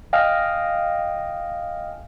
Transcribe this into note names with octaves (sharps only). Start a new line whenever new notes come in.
D#5 F5 G5 G#5 D#6 F6